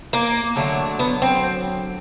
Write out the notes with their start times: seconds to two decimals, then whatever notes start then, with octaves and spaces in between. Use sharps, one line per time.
0.13 A#3
0.56 D3 F#3 A3
0.99 B3
1.22 C4